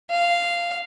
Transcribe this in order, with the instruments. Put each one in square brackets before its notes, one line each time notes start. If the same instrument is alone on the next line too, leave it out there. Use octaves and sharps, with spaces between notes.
[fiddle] F5